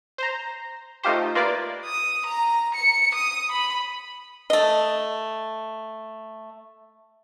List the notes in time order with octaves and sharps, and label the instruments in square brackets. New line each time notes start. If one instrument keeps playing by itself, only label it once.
[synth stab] C5 A#5
A3 D#4 F4 G4 C5
A#3 F4 B4 D5
[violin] D#6
A#5
C#7
D#6
B5
[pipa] A3 D#5